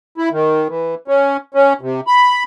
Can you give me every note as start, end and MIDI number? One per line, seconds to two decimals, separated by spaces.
0.18 0.29 64
0.31 0.68 51
0.69 0.95 52
1.08 1.37 61
1.54 1.73 61
1.81 2.01 48
2.07 2.44 83